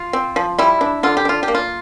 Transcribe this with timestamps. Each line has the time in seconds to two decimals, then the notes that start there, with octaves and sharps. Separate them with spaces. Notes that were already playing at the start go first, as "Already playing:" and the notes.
Already playing: F4
0.13 C4
0.36 F3
0.58 G3 E4
0.81 D4
1.03 D3 F4
1.17 G4
1.25 D4 F4
1.43 G4
1.48 A#3
1.55 F4